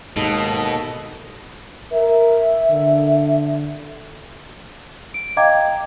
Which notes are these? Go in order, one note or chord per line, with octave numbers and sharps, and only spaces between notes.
D#2 G#2 B2 A4 D#5
A#4 E5
D3
D7
D#5 F5 G5 A#5 D6 G#6